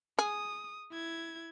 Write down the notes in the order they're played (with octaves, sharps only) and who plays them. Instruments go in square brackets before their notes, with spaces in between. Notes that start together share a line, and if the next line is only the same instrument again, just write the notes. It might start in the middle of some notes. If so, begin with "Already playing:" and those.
[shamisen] G#4 [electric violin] D#6
[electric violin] E4 G#6